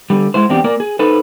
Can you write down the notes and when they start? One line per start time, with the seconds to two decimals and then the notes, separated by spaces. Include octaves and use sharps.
0.10 D3 G3
0.34 G#3 E4 C5
0.49 E2 C4 D4 G4
0.64 A#3 A#4 D5
0.80 G#4
0.99 D#4 A4 B4 C5